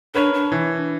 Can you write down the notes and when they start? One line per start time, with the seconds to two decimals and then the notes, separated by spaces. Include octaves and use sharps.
0.15 D4 A#4 B4 C#5
0.34 D4
0.52 E3